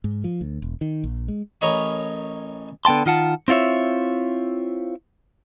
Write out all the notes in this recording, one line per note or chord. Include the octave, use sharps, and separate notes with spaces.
G#2
F3
D2
E1
D#3
A#1
G#3
A1 A#4 C#5 D#5 B5 C#6
D3 B3 G5 A5 C6
D#3 F4 F#5 A5
C4 E4 F4 C#5 E5